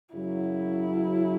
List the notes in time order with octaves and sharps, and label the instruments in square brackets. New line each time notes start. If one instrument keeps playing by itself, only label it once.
[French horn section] F#2 C#3 F#3 [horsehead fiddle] E4